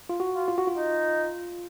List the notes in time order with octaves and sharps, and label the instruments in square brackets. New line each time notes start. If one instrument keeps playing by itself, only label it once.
[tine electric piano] F4
F#4
[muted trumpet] F4
[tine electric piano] F4
F#4
F4
[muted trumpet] D#4